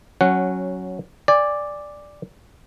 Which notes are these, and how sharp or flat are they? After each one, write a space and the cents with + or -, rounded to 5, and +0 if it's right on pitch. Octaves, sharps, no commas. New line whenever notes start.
F#3 +0 C#4 -10 F#5 +0
D5 +0 G#5 -30